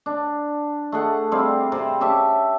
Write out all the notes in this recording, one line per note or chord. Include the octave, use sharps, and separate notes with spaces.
D4
A3 G#4 F#5
G3 C4 G#4 F5
C3 C5
C#4 G4 E5 A5